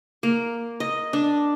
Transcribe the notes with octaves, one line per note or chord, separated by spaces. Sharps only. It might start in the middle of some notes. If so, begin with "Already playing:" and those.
A#3
D#5
D4